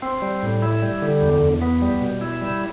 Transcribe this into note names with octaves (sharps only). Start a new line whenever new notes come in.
C4
G3
A2
E4
G3
D3
E2
E2
B3
G3
B2
E4
G3